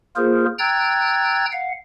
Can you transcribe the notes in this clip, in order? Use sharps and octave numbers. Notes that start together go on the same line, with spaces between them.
A#3 F4 G#4 A#4 C5
G5 A#5 E6 F#6 G#6 A6
F5 F#5